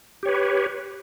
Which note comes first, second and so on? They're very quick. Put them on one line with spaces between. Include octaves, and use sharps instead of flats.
G4 C#5 B4